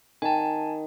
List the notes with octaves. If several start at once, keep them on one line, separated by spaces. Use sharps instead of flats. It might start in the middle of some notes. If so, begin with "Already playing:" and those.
D#3 G#5 A5